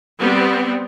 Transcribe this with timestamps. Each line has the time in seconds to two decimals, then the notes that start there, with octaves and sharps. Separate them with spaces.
0.20 G3 B3 C4